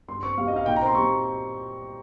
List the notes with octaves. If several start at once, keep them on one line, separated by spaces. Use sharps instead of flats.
G2 C6
C4 C#6
G3 F5
D#5
D#4 F5
A#2 G5
A#5
C4 C6
G3 C#6